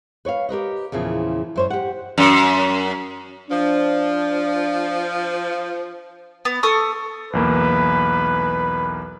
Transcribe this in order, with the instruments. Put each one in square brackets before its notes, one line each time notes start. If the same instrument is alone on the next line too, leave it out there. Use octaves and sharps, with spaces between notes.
[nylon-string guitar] B4 C#5 D#5 F5
G4 A#4 B4 D#5
E2 A#2 C#3 F3
F#2 C5 C#5
G4 F#5
[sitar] F#2
[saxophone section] F3 [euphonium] D4
[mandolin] B3
A4 C#6 D#6
[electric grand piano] B1 E2 A#3 [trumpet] B4